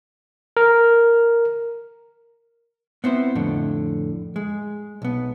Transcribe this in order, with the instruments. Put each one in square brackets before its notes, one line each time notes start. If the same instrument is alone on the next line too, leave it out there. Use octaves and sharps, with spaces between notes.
[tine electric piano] A#4
[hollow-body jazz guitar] B3 C4 E4 C5
F2 A2 D3
G#3
B1 B3